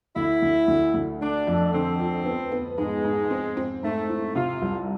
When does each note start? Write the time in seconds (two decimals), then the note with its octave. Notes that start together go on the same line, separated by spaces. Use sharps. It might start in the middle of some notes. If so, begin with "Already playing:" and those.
0.16 D2 E4
0.42 D2
0.68 D2
0.94 D2
1.21 A3 D4
1.47 F2
1.73 D3 C4
2.00 F3
2.25 B3
2.52 B3
2.78 G#2 G#3
3.05 G#2
3.31 C4
3.57 C4
3.83 G#2 A3
4.09 E4
4.35 C3 F4
4.62 C2